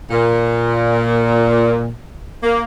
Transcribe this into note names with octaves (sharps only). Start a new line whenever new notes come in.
A#2
A#3